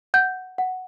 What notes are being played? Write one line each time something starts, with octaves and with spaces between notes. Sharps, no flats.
F#5 G6
F#5